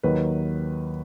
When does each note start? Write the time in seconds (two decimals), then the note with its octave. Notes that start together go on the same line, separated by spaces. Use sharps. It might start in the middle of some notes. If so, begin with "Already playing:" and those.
0.03 D#2 D#3 F#3 B4